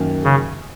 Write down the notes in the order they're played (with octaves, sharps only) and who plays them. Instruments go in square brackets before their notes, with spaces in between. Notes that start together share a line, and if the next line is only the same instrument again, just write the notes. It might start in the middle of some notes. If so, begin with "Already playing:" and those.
Already playing: [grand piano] F#2 D#3 A#3
[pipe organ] C#3